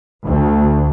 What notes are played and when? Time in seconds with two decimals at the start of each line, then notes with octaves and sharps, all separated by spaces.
0.24 D2